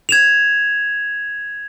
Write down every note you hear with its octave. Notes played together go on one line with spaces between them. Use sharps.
G#6 E7 F7